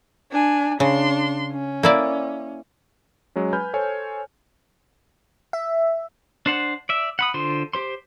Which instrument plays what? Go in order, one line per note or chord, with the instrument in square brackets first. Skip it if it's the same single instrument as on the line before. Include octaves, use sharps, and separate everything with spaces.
[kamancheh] D4 G#5
[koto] C#3 [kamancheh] D4 C6
[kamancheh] C#4
[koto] A#3 E4 D5
[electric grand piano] F#3 G#3 C#4
B4 G#5 B5 F6 G6
A4 C5 C#5 G#5
[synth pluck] E5
[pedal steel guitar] D4 C5 F#5
D5 E5
F#5 B5 D#6
D3 F4 C5 C6
G4 C5 C6